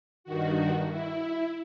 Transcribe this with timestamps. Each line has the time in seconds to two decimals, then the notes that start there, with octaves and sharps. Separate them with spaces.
0.24 G2 D#3 F#4
0.89 E4